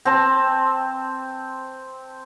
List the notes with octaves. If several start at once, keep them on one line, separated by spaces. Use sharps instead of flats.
C4 A5